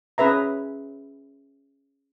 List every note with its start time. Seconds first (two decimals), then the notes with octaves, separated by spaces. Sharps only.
0.18 C#4 G#4 B4 E5 A#5